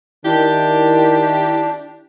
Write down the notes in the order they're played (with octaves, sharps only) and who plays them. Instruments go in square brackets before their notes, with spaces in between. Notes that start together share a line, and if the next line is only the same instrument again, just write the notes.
[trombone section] D#3 [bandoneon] D4 [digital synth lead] E4 [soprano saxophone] G4